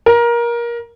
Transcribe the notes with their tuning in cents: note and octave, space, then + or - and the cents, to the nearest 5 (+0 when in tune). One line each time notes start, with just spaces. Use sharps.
A#4 +20